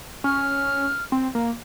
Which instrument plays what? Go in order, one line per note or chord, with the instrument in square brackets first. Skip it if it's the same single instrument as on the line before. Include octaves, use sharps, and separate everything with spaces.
[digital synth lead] C#4 [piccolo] F6
[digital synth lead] C4
A#3